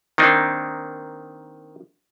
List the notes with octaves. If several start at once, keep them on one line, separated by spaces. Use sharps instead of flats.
D#3 A#3 C4 D4 D#4